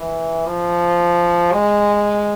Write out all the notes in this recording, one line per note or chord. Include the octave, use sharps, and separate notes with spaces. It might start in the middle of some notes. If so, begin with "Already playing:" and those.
Already playing: E3
F3
G#3